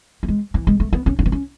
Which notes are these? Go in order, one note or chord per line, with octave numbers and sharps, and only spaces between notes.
A3
G#3
E3
G#3
A3
B3
C#4
D4
B3
C#4